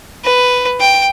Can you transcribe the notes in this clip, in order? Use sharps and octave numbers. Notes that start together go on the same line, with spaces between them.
B4
G5